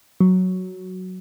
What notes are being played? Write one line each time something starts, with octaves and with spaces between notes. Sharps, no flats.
F#3